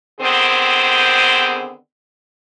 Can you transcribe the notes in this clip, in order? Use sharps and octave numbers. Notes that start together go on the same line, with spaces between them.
D3 D#3 B3 C4 G#4 C5